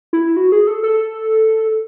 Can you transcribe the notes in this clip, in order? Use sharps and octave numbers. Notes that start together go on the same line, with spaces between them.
E4
F#4
G#4
A4
A4